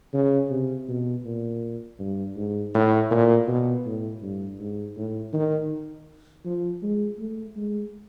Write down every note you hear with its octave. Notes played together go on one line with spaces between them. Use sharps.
C#3
C3
B2
A#2
G2
G#2
A2
A#2
B2
A2
G2
G#2
A2
D#3
F3
G#3
A3
G#3